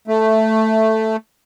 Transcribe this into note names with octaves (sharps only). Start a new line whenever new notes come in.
A3